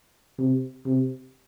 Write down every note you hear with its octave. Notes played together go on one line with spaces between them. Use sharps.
C3
C3